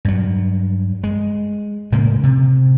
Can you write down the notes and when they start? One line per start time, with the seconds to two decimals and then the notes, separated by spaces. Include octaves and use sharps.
0.05 G2 F#3
1.04 G#3
1.92 A2 C#3 G#3 A#3
2.23 C3